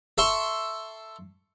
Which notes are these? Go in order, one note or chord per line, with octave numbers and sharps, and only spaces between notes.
A4 E5 C6 C#6